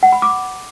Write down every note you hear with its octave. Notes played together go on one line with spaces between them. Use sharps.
F#5
B5
D6